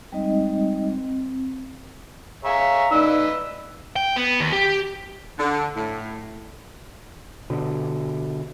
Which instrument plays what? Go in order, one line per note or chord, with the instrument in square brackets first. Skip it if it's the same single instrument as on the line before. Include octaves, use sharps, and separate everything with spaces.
[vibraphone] G3 G#3 C4 D#4 D#5
C4
[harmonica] G#4 C#5 E5 [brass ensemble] F5 A#5
[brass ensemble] A1 D#4 D5 [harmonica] B4 D#5 E6
[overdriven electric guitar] G5
B3
D#2
G4
[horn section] D3
A2
[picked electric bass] B2 D3